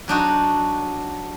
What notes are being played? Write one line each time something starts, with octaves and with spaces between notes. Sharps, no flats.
F#3 D4 D#4 F#4